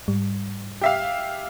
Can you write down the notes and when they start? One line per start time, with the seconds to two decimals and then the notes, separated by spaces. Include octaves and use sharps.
0.08 G#2 G3
0.81 G4 E5 F5